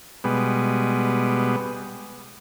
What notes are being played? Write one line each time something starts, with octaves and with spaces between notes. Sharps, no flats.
B2 G3 G#3 B3